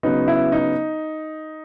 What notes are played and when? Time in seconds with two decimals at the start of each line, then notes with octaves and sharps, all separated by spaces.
0.03 C#3 F#3 B3 D#4
0.28 E4
0.52 D#4